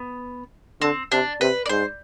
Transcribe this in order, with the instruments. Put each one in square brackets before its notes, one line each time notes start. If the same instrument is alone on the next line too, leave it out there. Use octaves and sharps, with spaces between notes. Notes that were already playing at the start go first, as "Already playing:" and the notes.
Already playing: [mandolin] B3
[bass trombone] D3 [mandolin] C4
[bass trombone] C3 [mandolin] D4
[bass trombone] C3 [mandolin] B4
[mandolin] D5
[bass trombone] G#2 [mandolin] C5